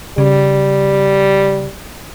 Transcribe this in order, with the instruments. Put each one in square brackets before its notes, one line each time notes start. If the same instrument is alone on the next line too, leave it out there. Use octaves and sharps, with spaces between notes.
[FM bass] C#3 [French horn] G3